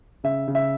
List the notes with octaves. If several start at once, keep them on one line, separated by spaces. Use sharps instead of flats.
C#3 E5
C#3
E5